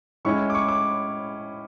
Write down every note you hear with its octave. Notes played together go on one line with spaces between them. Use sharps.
A2 G#3 C#4 E4 C#6
D6
C#6
D6